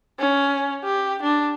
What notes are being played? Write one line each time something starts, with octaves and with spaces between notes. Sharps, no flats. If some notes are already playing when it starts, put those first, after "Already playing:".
C#4
G4
D4